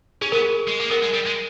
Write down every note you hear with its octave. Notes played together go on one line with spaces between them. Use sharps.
C#4 G#4
B3 A#4
G#4
G#3
A#3
B3 A#4
G#3
G3
G#3